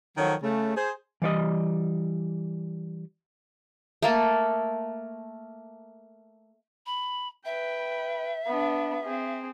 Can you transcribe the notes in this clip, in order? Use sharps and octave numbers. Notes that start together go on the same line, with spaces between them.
D#3 F3 F#3 A4 C#5
C#3 A3
G#4 C5
E3 G3 D5 D#5
A3 A#3 A5
B5
B4 E5 G5
B3 D4
C4 G#4